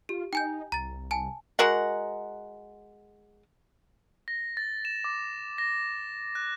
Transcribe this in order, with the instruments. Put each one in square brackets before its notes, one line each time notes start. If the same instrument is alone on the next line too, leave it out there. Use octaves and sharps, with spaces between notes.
[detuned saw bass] F4 [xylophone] G4
[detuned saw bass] D#4 [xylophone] G5 G#5 G6
[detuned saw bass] C2 [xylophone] A#5 A6
[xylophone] G#5 A5
[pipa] G#3 F#4 A#4 F#5
[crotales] A#6
A6
E7
D6
A#6
F#6